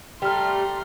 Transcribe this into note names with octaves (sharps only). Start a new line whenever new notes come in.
G3 A3 G5 A#5 C6 F6